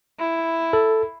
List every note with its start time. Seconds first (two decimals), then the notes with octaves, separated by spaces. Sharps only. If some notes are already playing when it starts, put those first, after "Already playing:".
0.19 E4
0.73 A4